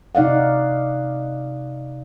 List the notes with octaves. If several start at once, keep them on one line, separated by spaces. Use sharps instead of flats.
C3 D#4 D5 F5 F#5